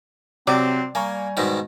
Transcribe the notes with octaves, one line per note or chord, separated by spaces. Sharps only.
C3 F#3 C4 D5
G3 A#3 G#5 A#5 C#6
G#2 B2 D#3